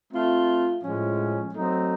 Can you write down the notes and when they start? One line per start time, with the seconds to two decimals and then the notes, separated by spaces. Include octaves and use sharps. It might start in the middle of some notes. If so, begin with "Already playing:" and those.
0.13 A3 C4 F4
0.83 A2 F3 G#3 C#4
1.54 F#3 A3 C4 D#4